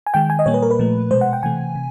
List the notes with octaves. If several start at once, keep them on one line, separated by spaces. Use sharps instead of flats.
G#5
D#3 G#3 G5
G#5
D#5
A#2 G3 A#3 C#5
B4
A#4
B4
A#2 F3 A3
B2 G#3 C5
F#5
G5
C3 E3 A3 G#5
C3